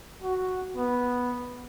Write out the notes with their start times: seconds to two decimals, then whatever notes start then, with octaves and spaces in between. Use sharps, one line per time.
0.22 F#4
0.77 B3